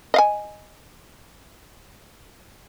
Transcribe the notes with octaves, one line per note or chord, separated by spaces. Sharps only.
D#5 F5 G#5